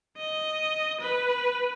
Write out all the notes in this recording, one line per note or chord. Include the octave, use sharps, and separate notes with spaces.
D#5
B4